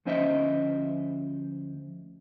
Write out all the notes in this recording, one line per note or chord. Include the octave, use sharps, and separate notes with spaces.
D2 F3 C#4 C5 D#5 E5